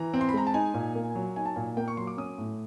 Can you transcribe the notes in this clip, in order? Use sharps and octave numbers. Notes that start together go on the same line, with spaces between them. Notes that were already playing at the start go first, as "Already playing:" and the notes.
Already playing: E3 A#5
C4
C6
B5
G#3 A#5
A5
D#4 G#5
A#2
A#3
F#3
D#4 G#5
A5
A#2 G#5
A#3 G5
C#6
F#3 C6
D6
C#4 D#6
A2